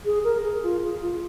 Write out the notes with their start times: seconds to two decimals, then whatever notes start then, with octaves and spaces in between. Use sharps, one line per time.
0.05 G#4
0.24 A#4
0.44 G#4
0.63 F4
0.83 G#4
1.02 F4